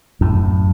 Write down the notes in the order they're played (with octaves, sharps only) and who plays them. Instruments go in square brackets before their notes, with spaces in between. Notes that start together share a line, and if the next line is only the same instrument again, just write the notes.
[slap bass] F#2 A2